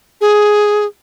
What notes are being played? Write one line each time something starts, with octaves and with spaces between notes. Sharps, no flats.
G#4